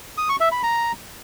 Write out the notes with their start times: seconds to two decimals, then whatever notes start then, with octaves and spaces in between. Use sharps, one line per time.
0.18 D#6
0.29 C#6
0.40 E5
0.52 B5
0.63 A#5